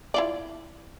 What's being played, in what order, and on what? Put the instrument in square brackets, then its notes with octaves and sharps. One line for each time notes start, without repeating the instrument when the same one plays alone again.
[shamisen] E4 F4 D5